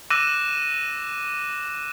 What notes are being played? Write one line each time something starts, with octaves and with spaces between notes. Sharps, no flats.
D6 E6 F#6 A#6 D#7 E7